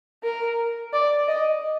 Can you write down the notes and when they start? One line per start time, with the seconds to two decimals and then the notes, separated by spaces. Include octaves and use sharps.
0.24 A#4
0.93 D5
1.28 D#5